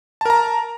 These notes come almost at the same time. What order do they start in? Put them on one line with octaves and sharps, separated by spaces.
A5 A#4 A#5